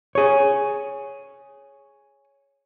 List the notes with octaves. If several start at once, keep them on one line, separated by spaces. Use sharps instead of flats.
G#4 C#5